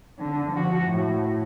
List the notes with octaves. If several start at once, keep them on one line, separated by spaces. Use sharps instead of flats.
D3
F3 F#4
A2